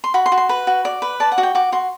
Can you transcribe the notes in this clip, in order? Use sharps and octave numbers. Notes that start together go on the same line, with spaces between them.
C6
F#4 B5
C6
F#4
C6
B4 B5
F#4
D5
B4
D5 A5
F#5
F#4
G5
F#4 D6
F#4 C6